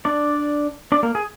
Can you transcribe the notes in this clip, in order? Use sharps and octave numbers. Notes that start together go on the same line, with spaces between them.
D4 D5
D4 D5
A#3 A#4
G#4